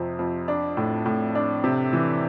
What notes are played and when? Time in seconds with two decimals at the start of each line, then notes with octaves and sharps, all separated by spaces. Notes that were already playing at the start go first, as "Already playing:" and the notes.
Already playing: F2 C3 C4
0.19 F2
0.48 D4
0.77 A2
1.06 A2
1.35 D4
1.64 C3
1.93 E3